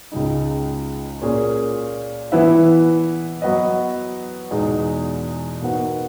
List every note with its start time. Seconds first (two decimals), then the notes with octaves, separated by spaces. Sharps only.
0.12 C#2 C#3 G#3 D#4
1.22 A#2 A#3 C#4 G#4
2.32 E3 B3 E4 B4 E5
3.42 F#3 B3 F#4 B4 D#5
4.51 E2 B2 G#3 D#4
5.62 B2 A#3 D#4 F#4 B4